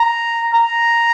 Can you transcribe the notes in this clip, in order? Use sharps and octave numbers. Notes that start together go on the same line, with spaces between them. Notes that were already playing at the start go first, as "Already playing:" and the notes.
Already playing: A#5
A#5